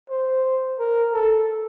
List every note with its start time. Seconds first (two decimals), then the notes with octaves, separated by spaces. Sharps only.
0.10 C5
0.79 A#4
1.13 A4